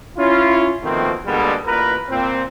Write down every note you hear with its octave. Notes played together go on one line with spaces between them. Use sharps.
C#4 E4 F4
B2 D#3 F3 A3 A#3 C4
B2 D3 G3 G#3 A#3 B3
A1 A#2 A#4 B4
A#2 C4